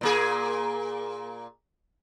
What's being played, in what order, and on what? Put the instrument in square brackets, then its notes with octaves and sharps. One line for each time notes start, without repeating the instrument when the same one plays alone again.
[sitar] A#2 A#3 G#4